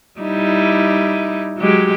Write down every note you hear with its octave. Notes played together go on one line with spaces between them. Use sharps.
G3 D#4 E4
F#3 G#3 G4